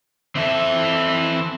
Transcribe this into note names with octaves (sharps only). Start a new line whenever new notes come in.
E3 C4 A4 E5